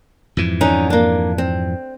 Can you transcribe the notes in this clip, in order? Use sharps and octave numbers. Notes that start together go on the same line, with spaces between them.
F2 G#2 E3
D3 C#4 D#4
A#3 D4
C4